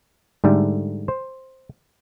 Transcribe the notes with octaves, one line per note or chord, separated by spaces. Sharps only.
G#2 D3 G3 A3
C5